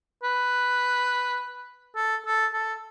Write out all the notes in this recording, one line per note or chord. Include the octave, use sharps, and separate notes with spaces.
B4
A4
A4
A4